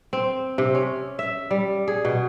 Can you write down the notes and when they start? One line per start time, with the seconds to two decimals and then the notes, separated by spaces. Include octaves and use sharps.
0.13 C4
0.58 C3
0.74 C#4
1.19 E5
1.51 G3
1.88 G#4
2.05 B2